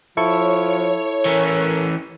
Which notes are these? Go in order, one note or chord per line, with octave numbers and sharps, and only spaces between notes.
F3 E4 A4 C#5 C#6
E3 C#4 A#4